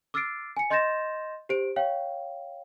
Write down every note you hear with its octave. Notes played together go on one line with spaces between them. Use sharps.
D6 E6 F6 A6 C7 D7
G#5 C#7
D#5 C6 G6 A6 A#6 E7
G4 C5 D7
C#5 F5 G5